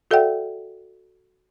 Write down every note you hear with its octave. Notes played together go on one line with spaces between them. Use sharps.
F#4 A4 D5 E5 F#5 G5